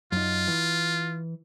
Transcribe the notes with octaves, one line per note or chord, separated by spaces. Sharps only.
F#2 D#4 F4
E3